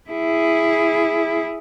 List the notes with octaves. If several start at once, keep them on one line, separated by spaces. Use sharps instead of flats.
E4 G#4